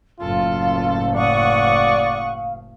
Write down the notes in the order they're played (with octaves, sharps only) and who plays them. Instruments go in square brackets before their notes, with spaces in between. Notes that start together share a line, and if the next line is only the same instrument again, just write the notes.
[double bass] F#1 A2 [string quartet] F#2 A4 [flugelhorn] F4 [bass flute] F5
[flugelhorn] D5 [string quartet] F#5 C#6 D#6